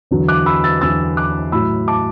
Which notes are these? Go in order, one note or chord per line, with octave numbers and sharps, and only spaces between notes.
E2 D3 F#3
D6 F#6
B5 E6
E6 A6
E2 D3 F#3 E6 A6
D6 F#6
A2 F#3 B5 E6
A5 D6